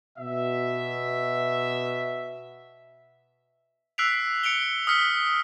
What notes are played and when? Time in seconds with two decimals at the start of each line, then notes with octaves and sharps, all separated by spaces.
0.19 B2 E5
3.98 E6 F#6 B6 C7 D7 F7
4.43 C#7 D7 F7 G7
4.87 D#6 F6 B6 C#7 G7